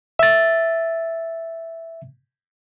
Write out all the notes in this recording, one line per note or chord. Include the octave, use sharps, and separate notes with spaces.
E5 A6